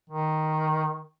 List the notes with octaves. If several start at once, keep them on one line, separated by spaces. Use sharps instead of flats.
D#3